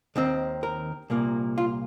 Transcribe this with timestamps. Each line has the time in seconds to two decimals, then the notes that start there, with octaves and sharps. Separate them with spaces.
0.16 D#2 D#3 C4
0.63 A#4
1.10 C2 A#2 A#3
1.58 F4